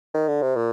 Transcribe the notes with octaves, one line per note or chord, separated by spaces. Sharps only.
D#3
D3
C3
A#2